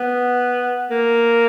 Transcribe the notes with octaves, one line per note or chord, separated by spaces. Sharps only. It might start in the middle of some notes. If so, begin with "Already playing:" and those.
Already playing: B3
A#3